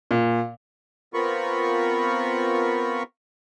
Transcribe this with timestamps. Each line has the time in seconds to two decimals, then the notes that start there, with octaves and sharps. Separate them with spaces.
0.11 A#2
1.14 B3 C4 F4 A#4 B5 C#6